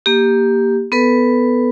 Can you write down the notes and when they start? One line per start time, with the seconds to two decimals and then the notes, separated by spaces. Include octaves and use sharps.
0.06 A#3 G4
0.92 B3 A4 B4